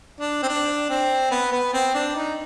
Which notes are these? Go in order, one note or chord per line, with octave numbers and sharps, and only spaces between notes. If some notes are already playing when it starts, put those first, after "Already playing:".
D4
C4
D4
C4
B3
B3
C4
D4
D#4